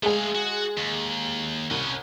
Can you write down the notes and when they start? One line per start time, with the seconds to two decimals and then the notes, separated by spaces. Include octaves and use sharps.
0.03 G#3 A3 G#4 F5
0.35 F#4
0.78 D#2
1.71 C2 C#4 B4